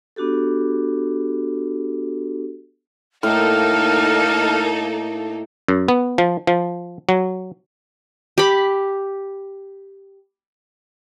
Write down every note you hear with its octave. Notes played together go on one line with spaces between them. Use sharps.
B3 D4 F#4 G4 A4
A2 A#3 D#4 A4 F6
F#2
B3
F3
F3
F#3
G4 B5